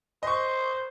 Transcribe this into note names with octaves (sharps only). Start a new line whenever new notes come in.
C5 D#5 C#6